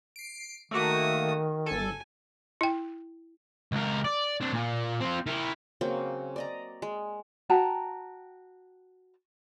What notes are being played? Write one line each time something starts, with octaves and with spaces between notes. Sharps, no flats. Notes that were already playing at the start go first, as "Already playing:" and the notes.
C7 D7
D#3 A3 A#3 F#4 D#6
G1 A4 G#5
E4 G5
C#2 A#4
D5
C4 D4
A#2
C4 F4
E4 A#4
C#3 F#3 A#3 C4
D5 D#5 A#5
G#3
F#4 G5 A5 A#5